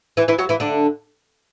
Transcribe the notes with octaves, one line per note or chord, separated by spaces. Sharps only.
E3 E4
E3 E4
F#3 F#4
E3 E4
D3 D4